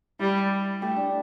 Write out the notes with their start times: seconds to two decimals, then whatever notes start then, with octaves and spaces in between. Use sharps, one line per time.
0.19 G3 E4
0.81 A3 G4
0.96 D4